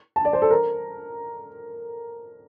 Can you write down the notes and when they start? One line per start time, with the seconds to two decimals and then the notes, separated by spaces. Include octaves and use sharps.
0.16 A5
0.25 D5
0.33 C5
0.42 A4
0.51 A#4